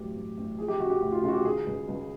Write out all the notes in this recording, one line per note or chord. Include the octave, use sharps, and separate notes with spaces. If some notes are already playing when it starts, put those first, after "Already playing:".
Already playing: A1 F#3 G4
A1
A1
F3 G#4
G4
C#3 F#4
G4
D2 F#4
F4
C#3 F4
F#4
G4
D#3 G#4
C#2
C#2